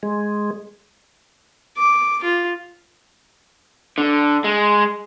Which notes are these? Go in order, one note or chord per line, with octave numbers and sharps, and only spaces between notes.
G#3
D6
F4
D3
G#3